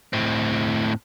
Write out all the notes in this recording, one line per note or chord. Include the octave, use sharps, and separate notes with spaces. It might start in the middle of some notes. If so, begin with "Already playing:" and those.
A2 C4